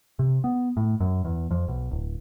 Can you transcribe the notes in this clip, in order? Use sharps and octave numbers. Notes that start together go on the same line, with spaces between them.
C3
B3
A2
F#2
E2
F2
B1
D1